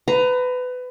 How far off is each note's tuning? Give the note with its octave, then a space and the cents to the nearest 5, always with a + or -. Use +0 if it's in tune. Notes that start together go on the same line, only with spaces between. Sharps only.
B4 +25 A#5 +0